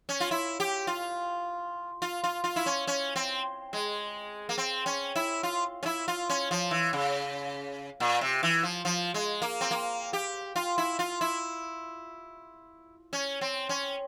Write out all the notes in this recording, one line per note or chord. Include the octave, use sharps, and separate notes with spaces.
C#4
F4
E4
G4
F4
F4
F4
F4
E4
C#4
C#4
C4
G#3
A#3
C4
C#4
E4
F4
C#4
E4
F4
C#4
F3
E3
C#3
A#2
C3
E3
F3
F3
G#3
A#3
C4
A#3
G4
F4
E4
F4
E4
C#4
C4
C#4